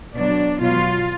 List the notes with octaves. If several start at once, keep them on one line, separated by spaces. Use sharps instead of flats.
B2 F#3 D4
B2 F#3 F4